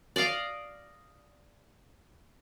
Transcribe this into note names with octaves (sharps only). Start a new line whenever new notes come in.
D5 D#5 F5 D6